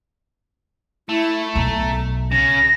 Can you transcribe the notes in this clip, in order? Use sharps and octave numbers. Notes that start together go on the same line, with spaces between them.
A3 E4
B1 B2 A#5
C#3 A#6